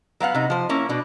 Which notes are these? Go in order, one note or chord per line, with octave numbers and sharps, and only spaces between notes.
F#3 B3 F5 F#5
C3 D#4
F3 C5
A#3 C#4 E4
B2 D4